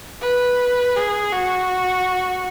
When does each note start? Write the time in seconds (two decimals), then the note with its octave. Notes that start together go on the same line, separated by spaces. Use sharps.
0.21 B4
0.96 G#4
1.32 F#4